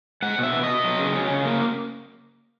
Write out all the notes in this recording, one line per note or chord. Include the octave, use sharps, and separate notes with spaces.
G#3 F#5
B2
E5
B3
D#5
B2
F#3
C#3
C#4
C#3
A#3